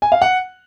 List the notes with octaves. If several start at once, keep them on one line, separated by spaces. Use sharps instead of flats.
G#5
F5
F#5